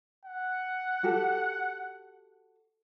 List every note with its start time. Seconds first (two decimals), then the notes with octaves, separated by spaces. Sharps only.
0.25 F#5
1.03 F#4 G4 A4